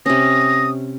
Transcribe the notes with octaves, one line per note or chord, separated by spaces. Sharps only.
C3 C#4 D#6 A#6